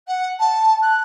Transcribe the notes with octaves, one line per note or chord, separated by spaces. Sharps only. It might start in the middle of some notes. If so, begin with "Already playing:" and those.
F#5
A5
F#6